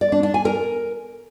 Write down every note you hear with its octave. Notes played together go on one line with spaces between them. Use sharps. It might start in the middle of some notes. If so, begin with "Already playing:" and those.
D5
D4
D4
G#5
A#4